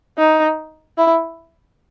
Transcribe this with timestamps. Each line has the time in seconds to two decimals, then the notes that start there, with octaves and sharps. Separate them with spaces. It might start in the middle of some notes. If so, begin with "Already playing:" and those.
0.18 D#4
0.98 E4